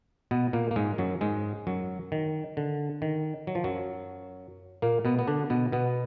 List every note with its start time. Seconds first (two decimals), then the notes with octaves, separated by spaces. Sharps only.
0.31 B2 B3
0.53 A#2 A#3
0.71 A#3
0.76 G#2 G#3
0.98 F#2 F#3
1.21 G#2 G#3
1.67 F#2 F#3
2.12 D#3
2.57 D3
3.02 D#3
3.47 F#3
3.55 F3
3.64 F#2 F#3
4.82 A#2 A#3
5.05 B2 B3
5.19 B3
5.27 D3 D4
5.50 B2 B3
5.72 B2 B3